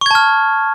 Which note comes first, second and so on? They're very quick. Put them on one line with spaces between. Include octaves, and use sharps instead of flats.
C#6 G#6 A5 F6